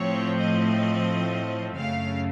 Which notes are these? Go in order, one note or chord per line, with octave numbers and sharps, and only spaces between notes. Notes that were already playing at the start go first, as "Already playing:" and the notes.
Already playing: A2 F3 A3 C4 C#5
D#5
F#2 C#3 A3 F5